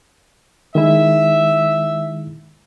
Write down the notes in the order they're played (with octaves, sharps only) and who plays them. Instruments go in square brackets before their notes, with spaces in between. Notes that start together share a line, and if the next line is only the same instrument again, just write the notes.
[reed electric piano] D#3 G#3 E4 [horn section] E5